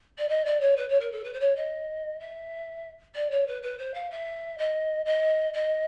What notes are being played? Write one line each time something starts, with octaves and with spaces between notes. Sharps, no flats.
D5
D#5
D5
C#5
B4
C#5
A#4
A4
B4
C5
C#5
D#5
E5
D5
C#5
B4
B4
C5
F5
E5
D#5
D#5
D#5